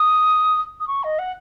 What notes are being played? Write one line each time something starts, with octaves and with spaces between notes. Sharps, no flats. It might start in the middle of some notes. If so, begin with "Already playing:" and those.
Already playing: D#6
D#6
C#6
D#5
F#5